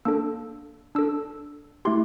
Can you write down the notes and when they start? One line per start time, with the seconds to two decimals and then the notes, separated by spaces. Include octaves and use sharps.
0.05 A#3 D4 A4 E6
0.95 D4 A4 E6
1.85 A3 E4 G4 C6